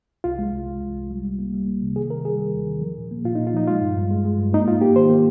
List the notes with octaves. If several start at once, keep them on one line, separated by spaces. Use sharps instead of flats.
C2 F4
G#3
C2
C2
C2
C2
G3
G3
A#3
G3
A#3
C3
D#3 G#4
D#3 A#4
G3 G#4
D#3
D#2
D#3
F3
A#2
A#3
A#2 F4
D#4
A#2
F4
F3 D#4
G#3 F4
G2
G2
G#3
G#3
G2
A#3 D#4
G#2 F4
A#3 G4
D#3 C5
A#3